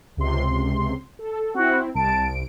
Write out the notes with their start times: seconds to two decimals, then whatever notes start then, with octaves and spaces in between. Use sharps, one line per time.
0.17 C#2 C3 C6
1.19 A4
1.55 C4 E4 F#4
1.95 C2 A5 D7